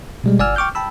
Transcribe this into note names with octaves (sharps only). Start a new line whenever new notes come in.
B2 G3 G#3
G1 D5 F#5 G#5 E6 F6
G5 C#6 D6 F6 G6
G5 A5 B5 E6